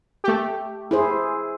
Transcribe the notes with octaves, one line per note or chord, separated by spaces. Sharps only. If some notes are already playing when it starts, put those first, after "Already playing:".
A3 G4
E4 G#4 C5